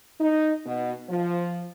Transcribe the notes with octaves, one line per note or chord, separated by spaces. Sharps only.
D#4
B2
F3